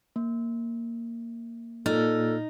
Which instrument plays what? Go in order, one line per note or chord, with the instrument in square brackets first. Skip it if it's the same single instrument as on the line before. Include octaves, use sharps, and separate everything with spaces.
[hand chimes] A#3
[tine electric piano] A#2 F6 A6 [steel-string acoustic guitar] D#4 [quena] A4